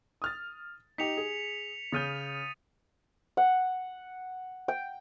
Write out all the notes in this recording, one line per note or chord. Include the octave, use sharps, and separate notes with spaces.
D#6 F6 A6
D#4 G4 B6 C#7 F7
G#4
C#3 D#6 F6 G6 A6 D#7
F#5
G5